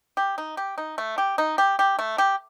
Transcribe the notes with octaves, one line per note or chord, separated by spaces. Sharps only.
G4
D#4
G4
D#4
A3
G4
D#4
G4
G4
A3
G4